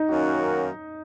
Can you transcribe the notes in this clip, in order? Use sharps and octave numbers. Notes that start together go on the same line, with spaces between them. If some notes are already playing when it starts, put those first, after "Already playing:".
Already playing: D#4
F#2 D#3 A#3 C#4 F#4